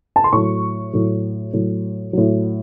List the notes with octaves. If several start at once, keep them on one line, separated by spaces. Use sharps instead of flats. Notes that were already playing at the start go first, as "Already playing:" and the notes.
A5
C6
A2 F#3 C#6
A2 F#3
A2 F#3
A2 F#3